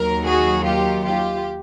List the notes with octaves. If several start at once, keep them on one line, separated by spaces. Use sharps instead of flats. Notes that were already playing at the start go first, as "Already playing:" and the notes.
Already playing: D#2 D#3 F#3 A#4
F#4 G#4
F4 G4
F4 G4